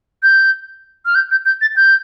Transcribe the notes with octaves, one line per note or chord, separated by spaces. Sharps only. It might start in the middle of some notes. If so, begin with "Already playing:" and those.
G6
F6
G6
G6
G6
A6
G6